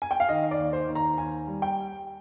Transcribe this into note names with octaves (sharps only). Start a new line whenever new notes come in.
G#5
G5
F5
D#3 D#5
D5
D#2
C5
D#2
A#5
D#2 G#5
G3
G5